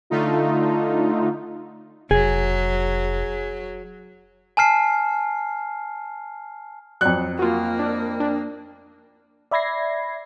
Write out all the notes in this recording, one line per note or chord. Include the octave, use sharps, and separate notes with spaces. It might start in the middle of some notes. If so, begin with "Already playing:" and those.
D3 A3 D#4 F4
F1 F#3 G#4
G#5 A5 F6 C7
F2 F#3 D5 F#6 C#7
A#3 F4 F#4
D4 D5
D4
D5 E5 B5 G#6 A#6 C7